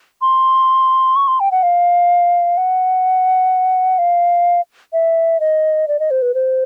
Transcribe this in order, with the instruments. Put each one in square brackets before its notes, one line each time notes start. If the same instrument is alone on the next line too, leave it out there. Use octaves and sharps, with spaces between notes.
[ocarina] C6
C#6
C6
G5
F#5
F5
F#5
F5
E5
D#5
D5
D#5
C5
B4
C5